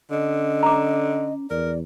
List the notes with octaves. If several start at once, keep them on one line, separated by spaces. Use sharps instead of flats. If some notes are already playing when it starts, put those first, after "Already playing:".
D3 C#4 D#5
A#5 D6
E2 A#4 D5